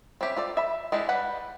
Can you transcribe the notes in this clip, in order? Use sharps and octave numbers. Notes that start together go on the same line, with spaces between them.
C4 C#4 G4 E5
F4 A4 D5
E5 B5
G#3 D4 E4 G4
G3 B4 F#5 B5